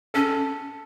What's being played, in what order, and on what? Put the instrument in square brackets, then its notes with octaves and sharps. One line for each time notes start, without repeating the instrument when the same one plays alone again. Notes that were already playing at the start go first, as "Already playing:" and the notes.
[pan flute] C#4 [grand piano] A4